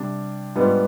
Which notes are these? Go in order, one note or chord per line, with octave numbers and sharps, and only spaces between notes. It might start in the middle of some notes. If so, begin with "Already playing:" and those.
Already playing: C3 G3 D4
G#2 G3 B3 D4 F4